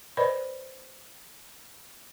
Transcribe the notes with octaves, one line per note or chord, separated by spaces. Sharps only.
B4 C5 D5 D#5 B5